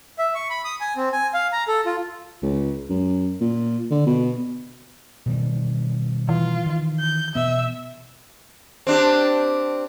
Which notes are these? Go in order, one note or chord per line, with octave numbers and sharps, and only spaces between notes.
E5
C#6
B5
D#6
G#5
C4
G#5
F5
A#5
A4
F4
C#2
F#2
A#2
D3
B2
B2 D#3 G3
E3 F4
D#3
G6
B2 B3 E5
C4 D4 G4